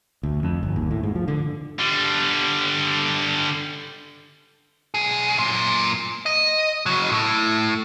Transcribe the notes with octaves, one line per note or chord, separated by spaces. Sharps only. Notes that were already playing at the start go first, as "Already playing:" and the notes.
D2
F2
G1
D#2
A2
G#2
F3
D3
D3 G3
B1 G#4
F#2 A#2
D#5
C#3 F#3
A2